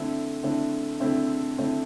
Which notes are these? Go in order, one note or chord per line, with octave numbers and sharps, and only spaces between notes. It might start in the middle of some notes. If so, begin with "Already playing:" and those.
Already playing: D3 A3 C4 E4
D3 A3 C4 E4
D3 A3 C4 E4
D3 A3 C4 E4